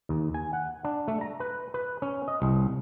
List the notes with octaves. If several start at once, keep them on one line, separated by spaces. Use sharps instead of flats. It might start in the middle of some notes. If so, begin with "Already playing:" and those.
D#2
G#5
F#5
D4
A3
A#5
B4
B4
C#4
D#5
C2